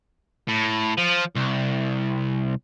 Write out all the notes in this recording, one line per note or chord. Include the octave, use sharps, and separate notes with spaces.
A2
F3
C2